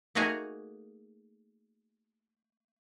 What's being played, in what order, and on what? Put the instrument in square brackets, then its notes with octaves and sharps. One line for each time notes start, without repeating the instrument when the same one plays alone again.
[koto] A3 A#3 D#4 F#4 G#4 A#4